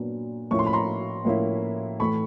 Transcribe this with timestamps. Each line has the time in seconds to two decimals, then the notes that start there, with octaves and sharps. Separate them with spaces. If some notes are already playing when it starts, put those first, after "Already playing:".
Already playing: A#2 F#3 B3 D4
0.51 A2 F3 A#3 C#4 E4 C#6
0.59 C6
0.66 B5
0.73 A#5 C6
1.25 A2 F3 A#3 C#4 E4
1.99 A2 E3 A3 B5 C#6